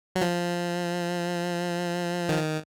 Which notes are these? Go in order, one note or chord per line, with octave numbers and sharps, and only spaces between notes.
F#3
F3
D#3